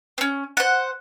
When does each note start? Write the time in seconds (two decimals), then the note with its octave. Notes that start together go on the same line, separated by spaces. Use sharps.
0.18 C4 C#4
0.57 C5 F#5